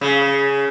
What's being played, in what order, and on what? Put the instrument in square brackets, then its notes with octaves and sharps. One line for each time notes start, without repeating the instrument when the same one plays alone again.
[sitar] C#3